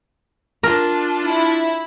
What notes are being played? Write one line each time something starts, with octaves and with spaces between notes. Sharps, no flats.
D4 F4 A#4
E4